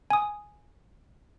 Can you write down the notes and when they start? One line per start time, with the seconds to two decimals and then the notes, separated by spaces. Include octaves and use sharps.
0.10 G#5 D#6